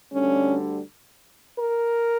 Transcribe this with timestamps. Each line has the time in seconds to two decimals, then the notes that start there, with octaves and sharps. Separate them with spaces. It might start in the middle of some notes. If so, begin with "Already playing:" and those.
0.12 D2 D3 G3 C#4
1.58 A#4